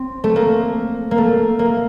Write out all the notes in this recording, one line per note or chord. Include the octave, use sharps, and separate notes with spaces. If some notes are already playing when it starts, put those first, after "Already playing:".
Already playing: C4
A3
A#3
A#3
A3
A#3